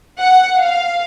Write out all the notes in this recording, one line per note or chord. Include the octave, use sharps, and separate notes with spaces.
F#5
F5